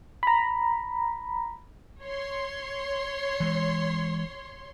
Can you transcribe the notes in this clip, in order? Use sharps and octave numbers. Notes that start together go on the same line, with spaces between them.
A#5 B5
C#5 C6
E3 G#3